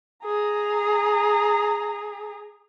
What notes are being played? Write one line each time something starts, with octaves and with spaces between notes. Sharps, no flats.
G#4 A#5